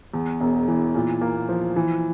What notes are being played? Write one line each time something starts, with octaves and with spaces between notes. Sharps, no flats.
E2
E1
E3
A#2
A#3
F3
E3